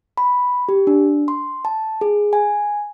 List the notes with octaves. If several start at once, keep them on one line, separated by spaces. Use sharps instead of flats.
B5
G4
D4
C6
A5
G#4
G#5